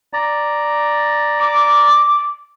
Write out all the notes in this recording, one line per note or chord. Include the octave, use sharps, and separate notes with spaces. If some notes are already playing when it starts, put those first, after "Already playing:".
D5 A#5
D6